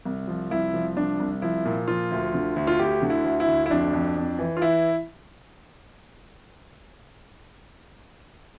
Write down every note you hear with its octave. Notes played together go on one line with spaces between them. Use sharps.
C2
F3
C2 E4
F3
C2 D4
C2
F3 E4
A#2
F3 F4
D2
D3
D2
F4
D2 G4
D3
E4
D2
E4
D2
E4
F2 D4
F2
F2
E3
F4
E3 E4